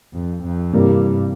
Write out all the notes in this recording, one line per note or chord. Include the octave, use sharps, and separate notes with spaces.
F2
F2
G2 C3 E3 G3 A#3